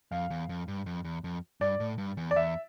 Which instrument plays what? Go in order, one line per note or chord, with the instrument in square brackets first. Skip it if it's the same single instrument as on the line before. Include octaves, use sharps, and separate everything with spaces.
[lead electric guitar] F2 [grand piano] F5
[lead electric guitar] E2
F2
G2
F2
E2
F2
[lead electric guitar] G2 [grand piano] D5
[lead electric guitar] A2
G2
E2
[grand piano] D5
[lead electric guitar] E2 [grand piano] E5